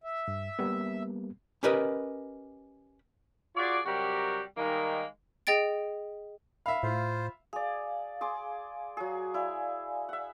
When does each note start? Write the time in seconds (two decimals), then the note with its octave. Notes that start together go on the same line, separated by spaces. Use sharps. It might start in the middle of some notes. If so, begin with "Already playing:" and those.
0.04 E5
0.28 G2
0.59 G3 A#3 B3
1.63 C#4 G4 A#4 B4 D#5
3.56 F4 F#4 G#4 D5
3.86 C3 F#3 G3 F#4 G4 A#4
4.57 D#3 G3 G#3 A#3 D#4 A#4
5.47 G#4 D#5 G5 A6 D7
6.66 E5 F5 B5
6.83 A2 F4 C5
7.53 G#4 D5 F5
8.21 G#4 C6 D6
8.97 F#3 G#4
9.34 E4 D5 F5 G#5
10.09 E5 F#5